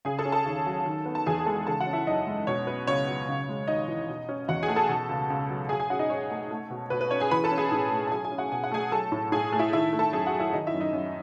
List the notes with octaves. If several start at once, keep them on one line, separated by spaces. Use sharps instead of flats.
C#3 G#4 G#5
A4 A5
C#4
A4 A5
D#2
F#3
D#3
B3
A5
E2 G#4 G#5
G#5
G#3 A4 A5
C#3 A4 A5
F#4 F#5
C#4
E4 E5
F#2 D#4 D#5
G#3
B2 C#5
B3 B4
C#2 C#5
F#3
C#3
G#3
D#2 D#4 D#5
E3
B2
C#4
E2 F#4 F#5
G#4 G#5
A3
A4 A5
B2
C#2
C#2
F#3
F#3 G#4 G#5
G#4 G#5
C#4 F#4 F#5
D#4 D#5
G#2 C#5
A3
A3
B2
B2 B4
B4
C#4 C#5
G#4 G#5
E3 B4 B5
A4 A5
C#4
G#4 G#5
A2
A3
A5
F#3 G#4 G#5
G#4 G#5
C#4
F#4 F#5
B2 G#5
F#5
A3 G#4 G#5
F#3 A4 A5
A2
A2 G#4 G#5
A3
E4 E5
D#3 E4 E5
A3
A4 A5
F#2 G#4 G#5
F#4 F#5
F#3
E4 E5
D#3 D#4 D#5
E4 E5
F#2
D#4 D#5
F#2